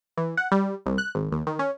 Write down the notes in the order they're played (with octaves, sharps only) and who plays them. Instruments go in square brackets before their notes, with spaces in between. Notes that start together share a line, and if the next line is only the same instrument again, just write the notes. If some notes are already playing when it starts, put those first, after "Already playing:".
[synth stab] E3
F#5
G3
C2
F#6
G#1
D#2
D#3
C#4